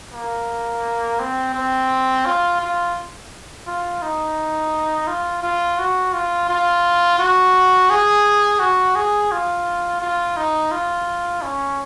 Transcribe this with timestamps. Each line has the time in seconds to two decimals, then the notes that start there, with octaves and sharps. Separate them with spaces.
0.14 A#3
1.20 C4
1.55 C4
2.26 F4
2.61 F4
3.67 F4
4.02 D#4
5.07 F4
5.43 F4
5.79 F#4
6.13 F4
6.49 F4
7.19 F#4
7.90 G#4
8.60 F#4
8.96 G#4
9.32 F4
10.02 F4
10.37 D#4
10.72 F4
11.42 C#4